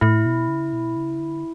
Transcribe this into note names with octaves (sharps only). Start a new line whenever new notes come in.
A2 E4
B2
C#3
B2
C#3
D3